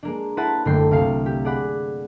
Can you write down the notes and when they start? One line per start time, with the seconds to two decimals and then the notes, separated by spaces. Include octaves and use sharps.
0.03 G#3 A#3 D4
0.37 E4 B4 C5 F#5 A5 B5
0.65 F#1 D3 A3 A#3 G5 C7
0.91 C2 F5 C7
1.26 G4
1.45 G#4 D5 F#5 B5